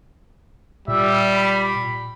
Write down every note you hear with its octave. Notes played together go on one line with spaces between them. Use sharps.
A#2 G3 E5
B5